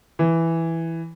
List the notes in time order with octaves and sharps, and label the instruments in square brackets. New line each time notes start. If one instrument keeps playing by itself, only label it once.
[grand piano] E3